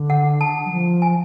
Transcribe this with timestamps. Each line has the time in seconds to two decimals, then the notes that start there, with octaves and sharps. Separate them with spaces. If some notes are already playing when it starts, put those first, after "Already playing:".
Already playing: D3
0.10 F#5
0.41 A5
0.65 F#3
0.72 F3
1.02 G#5